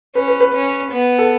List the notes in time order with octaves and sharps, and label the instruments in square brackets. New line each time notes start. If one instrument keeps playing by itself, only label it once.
[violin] C#4 [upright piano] B4
[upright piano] B4
B4
[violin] C#4
B3
[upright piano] A4